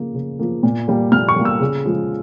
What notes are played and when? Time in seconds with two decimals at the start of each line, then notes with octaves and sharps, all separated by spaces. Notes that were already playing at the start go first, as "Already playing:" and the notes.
Already playing: C#3 F3 A#3
0.14 C#3
0.39 F3 A#3
0.63 A#2
0.88 G3 A#3
1.12 A#2 F6
1.28 C#6
1.36 G3 A#3
1.45 E6
1.60 C#3
1.85 F3 G#3